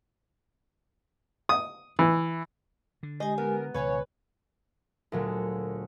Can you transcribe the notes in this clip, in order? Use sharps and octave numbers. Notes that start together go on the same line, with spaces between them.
D#6
E3
D3
G#3 G4 D#5 G#5
B3 A#4
C#2 B2 D#3 B4 C#5 F5 G#5 C#6
D2 A#2 F#3 G#3 A3